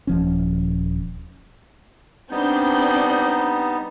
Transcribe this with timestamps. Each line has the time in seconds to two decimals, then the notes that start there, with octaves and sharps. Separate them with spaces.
0.07 D#1 F3 C#4
2.31 G3 B3 C4 D4 D#4 G6